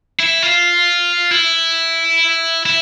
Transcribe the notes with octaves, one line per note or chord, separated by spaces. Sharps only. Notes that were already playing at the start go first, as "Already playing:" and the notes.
E4
F4
E4
E4